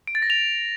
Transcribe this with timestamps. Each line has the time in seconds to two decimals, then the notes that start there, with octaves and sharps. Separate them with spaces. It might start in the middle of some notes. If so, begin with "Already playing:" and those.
0.07 D7
0.15 A6
0.22 A#6
0.30 F7